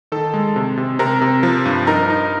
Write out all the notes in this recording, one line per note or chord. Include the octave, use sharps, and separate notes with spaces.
D#3 A4 A5
G#3
C3
C3
C3 A#4 A#5
C3
F3
G2
D#4 A#4 A#5
D#4